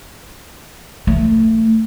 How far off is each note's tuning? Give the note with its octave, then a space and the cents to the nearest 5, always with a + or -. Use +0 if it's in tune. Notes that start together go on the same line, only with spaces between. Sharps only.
A3 +25